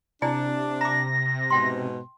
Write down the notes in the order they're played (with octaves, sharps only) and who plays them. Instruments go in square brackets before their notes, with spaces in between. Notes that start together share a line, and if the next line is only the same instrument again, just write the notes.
[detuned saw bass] C3 [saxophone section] D4 [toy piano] E4 D5 G#5
[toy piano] A#5 D6 [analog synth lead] A#6
[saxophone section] G#2 B2 [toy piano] G5 C6